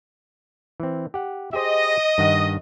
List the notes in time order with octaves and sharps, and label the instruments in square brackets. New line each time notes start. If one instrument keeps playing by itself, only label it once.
[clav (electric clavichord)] E3 C4
G4 F#5
[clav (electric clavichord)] G4 G#4 C5 [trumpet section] D#5
[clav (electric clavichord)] G2 D#3 F#5